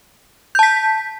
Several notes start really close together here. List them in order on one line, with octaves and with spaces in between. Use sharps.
G6 A5 B6